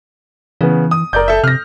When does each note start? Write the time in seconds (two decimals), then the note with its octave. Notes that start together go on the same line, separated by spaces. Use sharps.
0.61 C#3 E3 B3
0.91 D#6
1.13 F#1 A#4 D5 G6
1.28 A4 E5
1.44 C3 F6 A#6